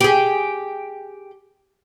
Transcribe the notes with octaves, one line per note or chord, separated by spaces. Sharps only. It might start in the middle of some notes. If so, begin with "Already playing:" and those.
G4 G#4